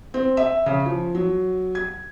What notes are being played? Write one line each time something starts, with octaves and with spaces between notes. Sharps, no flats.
C4
E5
C#3
F3
F#3
G#6